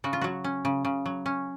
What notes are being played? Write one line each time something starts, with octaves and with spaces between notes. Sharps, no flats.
C#3 F#4
F4
F#3 F#4
C#4
C#3
C#3
F#3
C#4